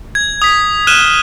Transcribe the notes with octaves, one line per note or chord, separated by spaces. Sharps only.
G#6
D#6 B6
F6 F#6 D#7 E7 G7